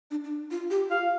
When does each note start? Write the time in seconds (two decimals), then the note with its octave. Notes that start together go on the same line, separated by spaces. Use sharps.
0.11 D4
0.24 D4
0.51 F4
0.70 G4
0.90 F4 F5